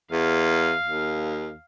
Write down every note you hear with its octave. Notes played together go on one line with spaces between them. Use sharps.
E2 F5
D#2